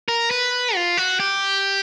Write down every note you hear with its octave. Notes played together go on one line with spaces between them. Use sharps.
A#4
B4
F4
F#4
G4